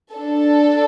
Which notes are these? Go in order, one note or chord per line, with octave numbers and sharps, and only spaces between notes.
D4 A4